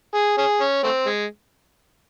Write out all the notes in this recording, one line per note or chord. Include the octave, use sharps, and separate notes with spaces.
G#4
C#4 G#4
C#4
A3 C4
G#3